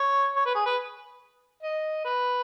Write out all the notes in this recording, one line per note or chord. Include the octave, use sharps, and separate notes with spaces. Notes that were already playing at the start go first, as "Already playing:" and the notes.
Already playing: C#5
C#5
B4
G#4
B4
D#5
B4